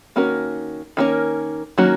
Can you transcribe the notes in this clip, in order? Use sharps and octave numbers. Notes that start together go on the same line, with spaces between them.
D#3 A#3 C#4 F#4 A#4
D#3 A#3 C#4 F#4 A#4
D#3 F#3 A#3 C#4 F#4